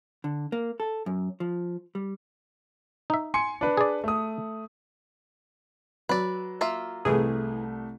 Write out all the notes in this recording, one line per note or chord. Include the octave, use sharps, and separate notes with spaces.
D3
A#3
A4
F#2
F3
G3
D#4 E5
G#5 C6 C#7
D4 B4
G#4 D5
A3 D#6
F#3 B4 D5
A#3 F4 E5
C2 E3 A3 G#4